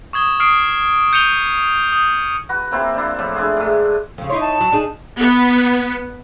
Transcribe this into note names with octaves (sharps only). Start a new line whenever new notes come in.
C#6 D#6 G#6 G7
D#6 F6 C7 D7
G6 C#7 D#7 F7 G7
D#6
F#4 B4
A#3 C4 E4 F4
F3 D4 E4
A2 F3
D4 E4 F4 G#4
G#2 A3
F2 C#3
D#4 E4 C#5 C6
A5
F#3
D4 D#4 G#4
B3